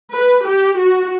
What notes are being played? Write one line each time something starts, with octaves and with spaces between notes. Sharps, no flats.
B4
G4
F#4